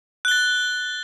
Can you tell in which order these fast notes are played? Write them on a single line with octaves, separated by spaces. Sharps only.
F#6 G7 A6